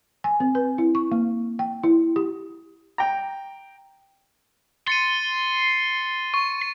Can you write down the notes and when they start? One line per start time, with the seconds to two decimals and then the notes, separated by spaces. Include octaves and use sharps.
0.24 G#5
0.40 C4
0.55 B4
0.78 E4
0.95 C#6
1.12 A#3
1.59 G5
1.83 E4
2.16 G4
2.98 G5 A#5
4.87 C6 A6 C#7 D#7
6.34 C#6